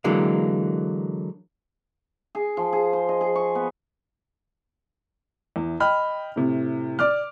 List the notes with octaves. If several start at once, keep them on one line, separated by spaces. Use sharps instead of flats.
D3 E3 F#3 G#3 A#3
G#4
F3
G#4
C5
D#5
G#4
C#6
B3
E2
D#5 G5 B5 F6
A2 C3
D5 D6 F6